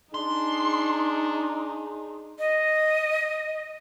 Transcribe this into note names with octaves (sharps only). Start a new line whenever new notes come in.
D4 D#4 G#4 C6
D#5